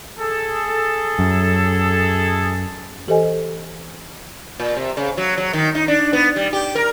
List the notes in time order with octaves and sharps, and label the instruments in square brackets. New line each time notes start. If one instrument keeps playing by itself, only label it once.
[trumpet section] G#4 A4
[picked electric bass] F#2
[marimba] E3 G4 A4 C5 D#5 G#5
[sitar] A#2
C3
C#3
F#3
F#3
D#3
D#4
D4
B3
G3
G4
A#4